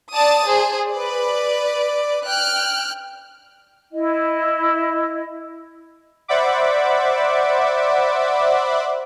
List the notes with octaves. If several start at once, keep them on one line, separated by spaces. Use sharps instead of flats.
D5 A5 D#6 A6
G#4 C5
B4 D5
G5 F6 F#6
E4 D#5
C5 D5 E5 F#5 B5 D6